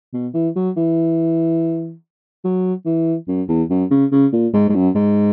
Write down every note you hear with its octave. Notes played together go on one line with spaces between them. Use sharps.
B2
E3
F#3
E3
F#3
E3
F#2
E2
F#2
C#3
C#3
A#2
G#2
G#2
F#2
G#2